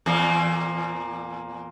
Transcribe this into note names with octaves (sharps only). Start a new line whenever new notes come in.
E2 A#2 A#3